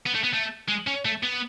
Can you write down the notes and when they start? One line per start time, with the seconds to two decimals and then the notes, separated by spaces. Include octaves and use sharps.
0.06 B3
0.14 A3
0.23 B3
0.33 A3
0.68 G#3
0.87 C#4
1.05 A3
1.23 B3